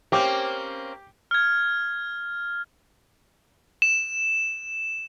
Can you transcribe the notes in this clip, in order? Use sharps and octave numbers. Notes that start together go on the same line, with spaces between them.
A#3 C4 C#4 G4 D6
F6 G#6
E7